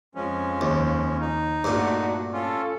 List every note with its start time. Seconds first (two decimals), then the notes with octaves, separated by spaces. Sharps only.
0.15 F2 F3 G#3 C#4
0.61 D#2
1.20 D#4
1.64 G2 A#2 A3 D4 F#4
2.33 C#4 F4 A4